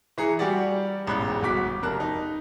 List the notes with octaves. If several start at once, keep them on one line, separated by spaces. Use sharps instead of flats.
E3 G#4 A#5 C#7
G3 F#4 G4 D5
E1 A1 G#2 B5 F#6
G1 F#4 D6 B6
F1 A#4 A5 F#6
D#4